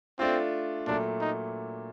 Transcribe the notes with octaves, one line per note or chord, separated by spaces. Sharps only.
A3 C4 D4 F4
A#2 F#3 A3 D4
D#4